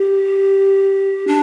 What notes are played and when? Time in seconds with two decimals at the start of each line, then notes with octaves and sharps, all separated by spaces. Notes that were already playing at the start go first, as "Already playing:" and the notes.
Already playing: G4
1.27 D4